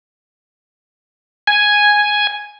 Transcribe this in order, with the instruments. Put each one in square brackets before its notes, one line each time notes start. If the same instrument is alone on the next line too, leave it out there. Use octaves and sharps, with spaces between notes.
[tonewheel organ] G#5